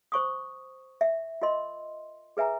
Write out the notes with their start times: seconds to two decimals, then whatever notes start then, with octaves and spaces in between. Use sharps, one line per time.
0.12 C5 C#6 D#6
1.01 E5
1.42 F4 A#4 D#5 C6
2.37 G#4 B4 E5 G#5 A#5